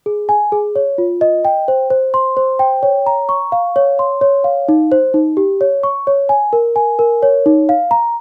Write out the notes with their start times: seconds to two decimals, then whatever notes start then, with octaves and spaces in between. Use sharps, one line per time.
0.06 G#4
0.29 G#5
0.52 G#4
0.76 C#5
0.98 F4
1.21 D#5
1.45 G5
1.68 C5
1.90 C5
2.14 C6
2.37 C5
2.59 G5
2.83 C#5
3.06 A#5
3.29 C#6
3.52 F5
3.76 C#5
3.99 C6
4.21 C#5
4.44 F5
4.69 D#4
4.92 C5
5.14 D#4
5.37 G4
5.61 C#5
5.83 C#6
6.07 C#5
6.29 G#5
6.53 A#4
6.76 G#5
6.99 A#4
7.22 C#5
7.46 D#4
7.69 F5
7.91 A#5